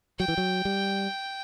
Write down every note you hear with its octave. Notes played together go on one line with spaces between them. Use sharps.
F#3 G5
E3
F#3
G3